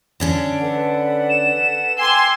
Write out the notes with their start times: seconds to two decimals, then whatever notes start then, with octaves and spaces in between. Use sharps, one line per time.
0.20 D3 C#4 D4
0.60 A4 B4 F#5
1.29 E7
1.98 G5 G#5 C6 D6 E6